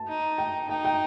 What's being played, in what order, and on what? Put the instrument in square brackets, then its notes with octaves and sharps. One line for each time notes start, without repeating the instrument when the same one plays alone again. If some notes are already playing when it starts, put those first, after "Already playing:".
Already playing: [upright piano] A5
[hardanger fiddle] D#4
[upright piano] G5
[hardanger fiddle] D#4 [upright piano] G5
[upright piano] G5